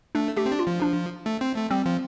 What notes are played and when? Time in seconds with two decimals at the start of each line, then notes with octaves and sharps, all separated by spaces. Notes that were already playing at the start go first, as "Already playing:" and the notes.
0.15 A3 D4
0.37 A3 G4
0.46 C4
0.52 D4
0.59 F4
0.67 F3
0.82 D4
1.26 A3
1.41 C4
1.56 A3
1.70 G3 C4
1.86 F3